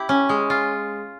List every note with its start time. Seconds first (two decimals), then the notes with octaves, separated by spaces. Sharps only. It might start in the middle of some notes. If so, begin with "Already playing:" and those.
Already playing: E4 G4
0.09 C#4
0.29 G#3
0.50 F4